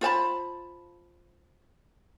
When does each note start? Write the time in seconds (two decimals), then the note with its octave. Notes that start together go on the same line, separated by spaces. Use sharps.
0.01 F4 C5 A5 B5